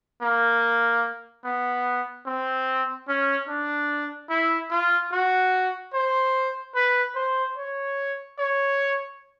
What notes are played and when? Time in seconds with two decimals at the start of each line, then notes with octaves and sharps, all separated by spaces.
0.22 A#3
1.44 B3
2.26 C4
3.08 C#4
3.48 D4
4.30 E4
4.70 F4
5.11 F#4
5.93 C5
6.75 B4
7.15 C5
7.57 C#5
8.38 C#5